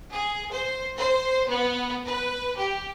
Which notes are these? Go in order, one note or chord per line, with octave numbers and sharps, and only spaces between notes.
G#4
C5
C5
B3
B4
G4